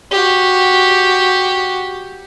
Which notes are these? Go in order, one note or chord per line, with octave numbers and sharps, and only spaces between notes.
F#4 G4